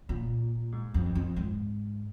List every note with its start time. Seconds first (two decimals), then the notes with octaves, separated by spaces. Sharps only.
0.09 A#2
0.72 G#2
0.94 F2
1.15 F2
1.36 G#2